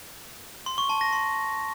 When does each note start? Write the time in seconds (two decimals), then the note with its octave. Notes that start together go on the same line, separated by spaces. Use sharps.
0.66 C6
0.78 C#6
0.89 A5
1.01 A#6
1.13 C6